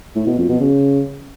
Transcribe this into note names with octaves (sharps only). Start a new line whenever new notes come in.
A2
B2
F2
B2
C#3